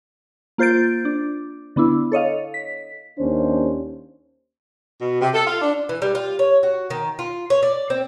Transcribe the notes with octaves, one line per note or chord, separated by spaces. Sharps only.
A#3 F4 C5 G6 A6 D7
D4
D3 B3 D4 E4
A4 C#5 D#5 F5
B6
D#2 C#4 D4 C5
B2
C3
A4
F4
D4
E3
G3
F4
C#5
F#4
D#3
F4
C#5
D5
C4